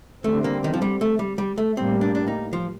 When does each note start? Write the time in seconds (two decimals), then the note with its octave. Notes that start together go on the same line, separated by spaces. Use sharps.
0.24 D3 G3 A3 C4
0.44 A#3
0.64 D#3
0.74 F3
0.82 G3
1.01 A3
1.19 G3
1.38 G3
1.58 A3
1.77 A2 G3 A#3 C4
2.01 D4
2.15 D4
2.28 D#4
2.53 F3